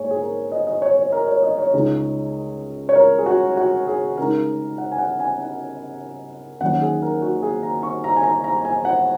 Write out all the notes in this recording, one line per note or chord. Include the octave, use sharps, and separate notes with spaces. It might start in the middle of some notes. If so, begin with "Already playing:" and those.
Already playing: G#2 A#3 G#4 C#5
G#4
A#4
D#5
D#5
C#5
C#5
A#4
C#5
D#5
C#5
C#2 C#3 G#3 D#4
C#5
A#4
G#4
F#4
F#4
G#4
C#3 G#3 D#4 A#4
F#5
G#5
F#5
G#5
F#5
D#2 D#3 F#3 C#4 F#5
G#4
A#4
F#4
G#4
A#5
C#6
A#5
G#5
A#5
A#5
G#5
F#5